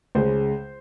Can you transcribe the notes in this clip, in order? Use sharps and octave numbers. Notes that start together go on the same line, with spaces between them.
C#2 C#3 G#3 C5